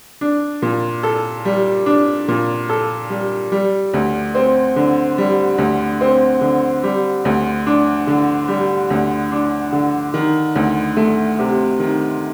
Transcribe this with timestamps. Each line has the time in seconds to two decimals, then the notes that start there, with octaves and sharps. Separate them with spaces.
0.21 D4
0.62 A#2
1.03 A4
1.45 G3
1.86 D4
2.28 A#2
2.69 A4
3.10 G3
3.52 G3
3.94 D2
4.35 C4
4.76 D3
5.18 G3
5.58 D2
6.01 C4
6.41 D3
6.83 G3
7.25 D2
7.67 D4
8.07 D3
8.48 G3
8.90 D2
9.32 D4
9.72 D3
10.14 D#3
10.56 D2
10.97 A3
11.39 C3
11.79 D#3